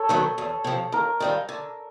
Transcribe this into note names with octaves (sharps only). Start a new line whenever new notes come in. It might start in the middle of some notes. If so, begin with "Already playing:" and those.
Already playing: A4 C#5
D#3 F#3 B3
E2
C3 F3
D#2 A#4
D#3 G3 C4 F4
D3